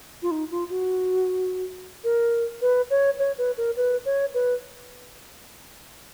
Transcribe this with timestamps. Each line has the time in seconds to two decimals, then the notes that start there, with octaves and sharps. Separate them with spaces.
0.22 F4
0.31 D#4
0.51 F4
0.70 F#4
2.04 A#4
2.62 B4
2.90 C#5
3.19 C#5
3.38 B4
3.57 A#4
3.77 B4
4.05 C#5
4.34 B4